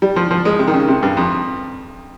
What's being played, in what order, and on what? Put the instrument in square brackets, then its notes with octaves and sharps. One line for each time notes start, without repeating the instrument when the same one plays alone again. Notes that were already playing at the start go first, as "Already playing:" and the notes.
[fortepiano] G3
F3
F3
G#3
C3
D#3
C#3
C3
G2
F2